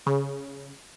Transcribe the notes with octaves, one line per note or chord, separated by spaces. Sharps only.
C#3